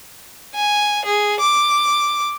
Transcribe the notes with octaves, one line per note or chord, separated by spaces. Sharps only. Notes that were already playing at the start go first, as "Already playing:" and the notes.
G#5
G#4
D6